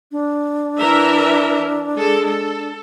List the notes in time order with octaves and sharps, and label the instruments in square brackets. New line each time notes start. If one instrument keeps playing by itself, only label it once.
[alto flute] D4
[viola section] E3 A#4 E5
G#3 A4
A4